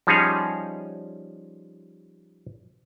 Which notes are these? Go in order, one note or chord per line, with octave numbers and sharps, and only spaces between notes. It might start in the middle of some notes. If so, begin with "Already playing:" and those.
F3 G3 C#4 D#4 G#4 C#5